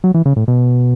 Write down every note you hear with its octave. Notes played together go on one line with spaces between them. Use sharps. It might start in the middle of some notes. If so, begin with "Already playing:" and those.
F#3
E3
C#3
A2
B2